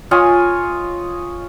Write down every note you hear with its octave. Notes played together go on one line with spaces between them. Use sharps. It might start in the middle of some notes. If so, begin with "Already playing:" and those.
F4 C#5 D#5 G#5